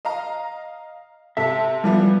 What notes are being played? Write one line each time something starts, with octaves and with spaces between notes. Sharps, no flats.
D#5 F5 A#5
C3 A4 E5
E3 F3 G3 B3